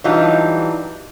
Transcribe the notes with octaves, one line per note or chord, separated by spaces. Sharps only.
E3 F#3 G3 D4 D#4 F4